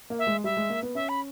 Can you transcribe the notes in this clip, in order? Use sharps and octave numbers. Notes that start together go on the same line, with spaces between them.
A#3
E5
G#3
G3 E5
G#3
A#3
B3
C#4 E5
B5